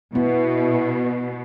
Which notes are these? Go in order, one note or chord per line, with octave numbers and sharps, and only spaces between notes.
B2 B3 E4